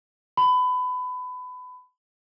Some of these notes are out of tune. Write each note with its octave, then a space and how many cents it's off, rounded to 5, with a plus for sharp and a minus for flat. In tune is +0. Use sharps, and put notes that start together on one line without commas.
B5 +25